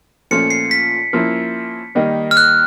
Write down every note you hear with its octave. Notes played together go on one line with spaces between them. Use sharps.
A#2 F3 A3 C#4 F4 C#7
C7
B6
F3 A#3 C#4 E4
D#3 G3 A#3 D#4
F6
F#6